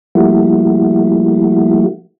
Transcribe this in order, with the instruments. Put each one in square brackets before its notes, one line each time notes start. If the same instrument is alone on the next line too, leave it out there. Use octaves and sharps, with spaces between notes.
[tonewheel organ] F3 G3 A3 A#3 E4 F#4